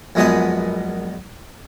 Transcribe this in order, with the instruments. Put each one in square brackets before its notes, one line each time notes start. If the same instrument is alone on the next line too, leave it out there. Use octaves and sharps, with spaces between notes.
[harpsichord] A#1 F#2 G#3 B3 G#4 D#5